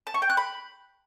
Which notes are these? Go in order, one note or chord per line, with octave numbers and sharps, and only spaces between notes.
A5
C#6
G5
F#6
B5